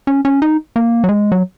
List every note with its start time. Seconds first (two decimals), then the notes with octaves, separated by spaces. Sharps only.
0.07 C#4
0.25 C#4
0.42 D#4
0.76 A#3
1.04 F#3
1.09 G#3
1.32 F#3